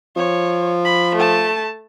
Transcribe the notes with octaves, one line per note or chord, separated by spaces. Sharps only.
F3 C#5
B5
A3 A5